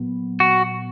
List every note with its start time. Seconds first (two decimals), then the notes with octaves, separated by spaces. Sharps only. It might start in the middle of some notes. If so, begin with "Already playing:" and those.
Already playing: A#2 F#3 B3
0.40 F#4